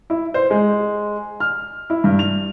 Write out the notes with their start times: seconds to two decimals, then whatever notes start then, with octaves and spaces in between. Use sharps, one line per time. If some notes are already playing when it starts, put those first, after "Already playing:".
0.10 E4
0.34 C5
0.50 G#3
1.40 F6
1.90 E4
2.04 G2
2.19 F7